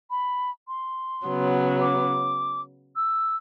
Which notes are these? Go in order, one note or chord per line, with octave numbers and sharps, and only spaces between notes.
B5
C6
C#3 F#3 B3
D6
E6